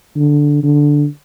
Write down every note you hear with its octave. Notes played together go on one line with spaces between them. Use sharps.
D3
D3